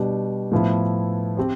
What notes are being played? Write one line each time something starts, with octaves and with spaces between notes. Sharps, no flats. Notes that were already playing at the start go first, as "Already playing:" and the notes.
Already playing: B2 G3 D4 G4
A2 F3 B3 E4
C4 G4 C5